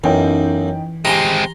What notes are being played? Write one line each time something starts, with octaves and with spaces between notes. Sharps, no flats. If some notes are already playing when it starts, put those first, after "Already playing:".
B1 F#2 E3 C#4 D#4 G5
G#3 C4 G4 G#5 A#5 C6